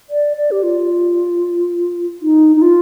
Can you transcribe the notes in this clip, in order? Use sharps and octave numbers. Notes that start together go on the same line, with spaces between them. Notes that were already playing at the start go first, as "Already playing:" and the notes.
D5
D5
G4
F4
D#4
D#4
F4